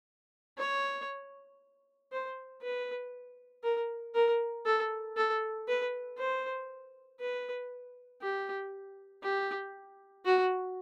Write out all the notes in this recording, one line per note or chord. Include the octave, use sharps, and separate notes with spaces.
C#5
C5
B4
A#4
A#4
A4
A4
B4
C5
B4
G4
G4
F#4